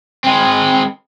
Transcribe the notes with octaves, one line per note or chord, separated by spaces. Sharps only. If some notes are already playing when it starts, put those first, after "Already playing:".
G#3 C4